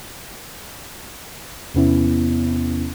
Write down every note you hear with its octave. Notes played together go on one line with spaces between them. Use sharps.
E2 C3 B3 C#4 E4